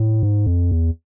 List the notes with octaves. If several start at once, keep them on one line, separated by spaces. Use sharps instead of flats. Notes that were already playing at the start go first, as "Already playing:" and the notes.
Already playing: A2
G#2
F2
E2